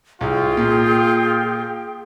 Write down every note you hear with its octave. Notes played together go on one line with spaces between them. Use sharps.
C2 F4 G#4 G5
A#2